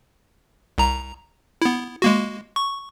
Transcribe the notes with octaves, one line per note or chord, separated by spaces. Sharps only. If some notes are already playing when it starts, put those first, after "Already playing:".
C2 A#5
B3 E4
G#3 A#3 F#4
C#6